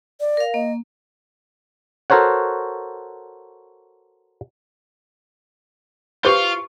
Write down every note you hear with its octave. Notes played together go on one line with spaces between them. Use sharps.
D5
A#4 F5
A#3 D#5
F#4 A4 A#4 C5 C#5 F#5
F4 G4 B4 C5 F5 C#6